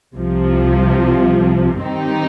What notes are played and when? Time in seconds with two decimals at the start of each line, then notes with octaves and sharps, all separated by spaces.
0.15 C2 C3 F3
1.81 G2 D#3 C4 D#4 G4